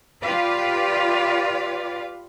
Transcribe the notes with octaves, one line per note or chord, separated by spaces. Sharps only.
F4 G4 B4 D5 F5